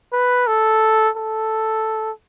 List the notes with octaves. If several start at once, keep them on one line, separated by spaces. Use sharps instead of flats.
B4
A4
A4